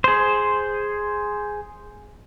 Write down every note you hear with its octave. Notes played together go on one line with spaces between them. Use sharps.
G#4 C5